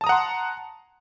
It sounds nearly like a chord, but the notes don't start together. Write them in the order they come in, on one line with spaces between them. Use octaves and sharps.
A5 D#6 A#5 F#5 C6